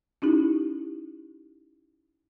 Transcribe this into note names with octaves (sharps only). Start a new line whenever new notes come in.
C#4 D#4 E4 G4